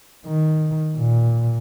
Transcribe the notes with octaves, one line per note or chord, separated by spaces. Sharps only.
D#3
A#2